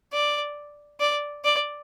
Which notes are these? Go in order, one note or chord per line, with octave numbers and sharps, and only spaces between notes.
D5
D5
D5